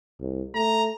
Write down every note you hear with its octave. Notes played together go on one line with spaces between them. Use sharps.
C2
A3 A#5